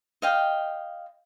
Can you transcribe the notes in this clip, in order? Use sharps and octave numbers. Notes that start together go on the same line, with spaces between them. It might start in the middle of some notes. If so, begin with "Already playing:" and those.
D#5 F5 G5